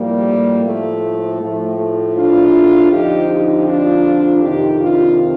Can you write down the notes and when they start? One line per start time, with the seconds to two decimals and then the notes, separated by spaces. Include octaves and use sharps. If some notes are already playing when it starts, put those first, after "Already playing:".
Already playing: A2 F3 G3 A#3
0.64 A3
1.40 A2 F3 A3
1.78 A3
2.15 D4 F4
2.91 F2 D3 F3 D#4 G4
3.29 D#4 G4
3.66 D4 F4
4.42 F2 C3 D#3 D#4 G4
4.80 D4 F4